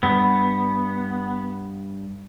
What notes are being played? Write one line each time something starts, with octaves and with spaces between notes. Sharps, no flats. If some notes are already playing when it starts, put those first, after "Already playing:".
G2 G3 B3